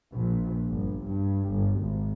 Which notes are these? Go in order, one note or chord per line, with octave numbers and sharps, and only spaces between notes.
A#1
G1
G2
G1
G#1